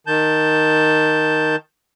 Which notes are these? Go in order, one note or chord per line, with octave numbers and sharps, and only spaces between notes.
D#3 A5 G6